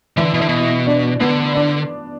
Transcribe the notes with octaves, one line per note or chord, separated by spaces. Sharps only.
D3 E3 E4
B2
D3
B2
D4
D3 B3
D4